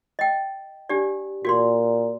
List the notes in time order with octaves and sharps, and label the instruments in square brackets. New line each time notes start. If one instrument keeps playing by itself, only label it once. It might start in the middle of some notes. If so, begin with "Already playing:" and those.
[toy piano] D#5 G5
D4 G4 D5
[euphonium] A#2 [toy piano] F#4 D5 C6